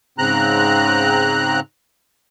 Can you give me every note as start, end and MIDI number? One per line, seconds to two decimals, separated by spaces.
0.18 1.60 44
0.18 1.60 49
0.18 1.60 60
0.18 1.60 82
0.18 1.60 90